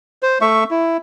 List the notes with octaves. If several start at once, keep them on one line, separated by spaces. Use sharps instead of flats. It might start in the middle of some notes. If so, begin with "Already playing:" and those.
C5
A3 E5 C#6
E4